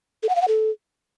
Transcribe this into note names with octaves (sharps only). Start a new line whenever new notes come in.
A4
F#5
F5
F#5
A4